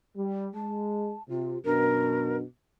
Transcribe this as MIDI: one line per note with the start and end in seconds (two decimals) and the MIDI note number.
0.16 0.49 55
0.55 1.14 56
0.55 1.23 81
1.29 1.57 48
1.29 1.59 65
1.65 2.44 42
1.65 2.44 47
1.65 2.41 62
1.65 2.37 70